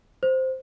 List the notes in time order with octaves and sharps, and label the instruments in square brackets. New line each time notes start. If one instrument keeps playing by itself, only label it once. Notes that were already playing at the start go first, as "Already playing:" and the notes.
[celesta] C5